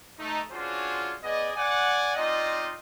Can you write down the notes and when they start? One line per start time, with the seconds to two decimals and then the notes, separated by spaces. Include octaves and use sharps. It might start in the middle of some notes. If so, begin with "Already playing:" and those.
0.19 A3 D#4
0.52 C#4 D4 F4 F#4 G#4 C5
1.24 B3 G#4 D5 D#5
1.56 D5 F#5 G#5
2.16 C4 D#4 F4 D5 D#5